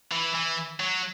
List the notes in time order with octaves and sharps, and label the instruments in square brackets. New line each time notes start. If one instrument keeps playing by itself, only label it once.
[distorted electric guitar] E3
E3
F#3